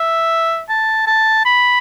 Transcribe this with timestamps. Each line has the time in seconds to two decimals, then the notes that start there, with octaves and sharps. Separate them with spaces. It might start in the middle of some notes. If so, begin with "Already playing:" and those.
Already playing: E5
0.70 A5
1.07 A5
1.45 B5